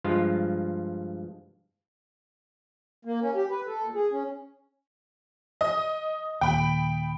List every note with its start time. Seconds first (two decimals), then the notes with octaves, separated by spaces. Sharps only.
0.04 G2 F3 G#3 F4
3.05 A#3
3.22 C#4
3.35 G4
3.50 B4
3.67 A4
3.82 A#2
3.95 G#4
4.12 C#4
5.61 D#5 D#6
6.41 D#2 A#2 G5 B5